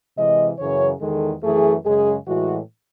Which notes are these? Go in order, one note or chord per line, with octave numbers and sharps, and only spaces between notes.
C3 E3 G#3 D#5
F#2 C#3 E3 C#5
E2 D#3 G#3 A4
F#2 E3 A3 G#4
F#2 C#3 G#3 G#4
A2 E3 G#3 F#4